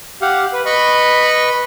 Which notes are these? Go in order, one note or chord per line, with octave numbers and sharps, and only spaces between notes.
G4 F5 F#5
B4
B4 D#5 B5 C#6